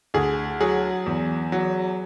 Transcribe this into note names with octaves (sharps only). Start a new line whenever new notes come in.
D2 G#4
F#3 G#4
E2
F#3